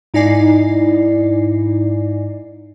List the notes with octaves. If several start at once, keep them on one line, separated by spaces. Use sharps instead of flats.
G#2 D#4 E4 D5 G#5 C7